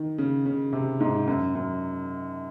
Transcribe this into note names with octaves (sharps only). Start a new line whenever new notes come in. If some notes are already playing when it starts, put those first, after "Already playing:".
Already playing: D#3
C#3
C#3
C3
G#2
F#2
F#2